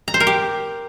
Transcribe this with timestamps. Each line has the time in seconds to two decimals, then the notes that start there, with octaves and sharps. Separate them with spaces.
0.08 A#5
0.14 C5
0.20 A#4
0.27 G4